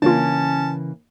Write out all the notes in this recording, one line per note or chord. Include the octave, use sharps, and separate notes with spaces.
C#3 E3 A#3 C#4 D4 F4 A5